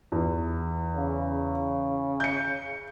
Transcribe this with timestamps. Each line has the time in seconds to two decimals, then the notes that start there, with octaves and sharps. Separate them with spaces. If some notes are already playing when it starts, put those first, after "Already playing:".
0.12 E2
0.96 C#3
2.20 G6 C#7